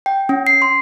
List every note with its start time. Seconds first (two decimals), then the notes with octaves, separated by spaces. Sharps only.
0.06 G5
0.29 C#4
0.47 C7
0.62 C6